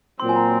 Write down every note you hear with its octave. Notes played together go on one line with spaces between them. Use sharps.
A#2 F#3 C4 C6
G#5
A#5